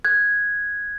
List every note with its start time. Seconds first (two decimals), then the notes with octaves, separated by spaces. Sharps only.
0.05 F#6 G#6